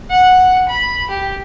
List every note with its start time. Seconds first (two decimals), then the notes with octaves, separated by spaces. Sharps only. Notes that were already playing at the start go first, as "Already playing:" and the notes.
0.10 F#5
0.69 B5
1.10 G4